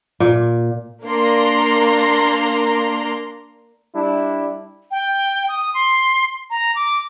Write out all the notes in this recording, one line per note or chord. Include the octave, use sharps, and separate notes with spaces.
A#2
A#3 D4 A#5 C6
G3 D4 E4
G5
D#6
C6
A#5
D6